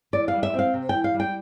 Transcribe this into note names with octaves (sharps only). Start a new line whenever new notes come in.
E3 D5
F5
G3
E5
C4 F5
C3
E3 G5
F5
G3
G5